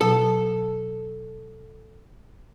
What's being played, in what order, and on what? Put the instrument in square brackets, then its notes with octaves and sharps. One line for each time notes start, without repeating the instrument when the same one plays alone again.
[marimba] B2 F#3 [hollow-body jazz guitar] A4